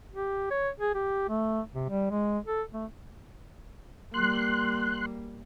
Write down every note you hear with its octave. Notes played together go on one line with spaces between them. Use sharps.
G4
C#5
G#4
G4
A3
C3
G3
G#3
A4
A3
G3 A#3 C6 F#6